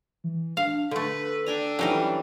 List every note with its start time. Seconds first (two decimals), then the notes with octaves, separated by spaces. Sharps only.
0.24 E3
0.57 D4 F5
0.91 D3 A3 A4 B4
1.46 D4 G5 G#5 A#5
1.79 E3 F#3 G3 C#4 D#4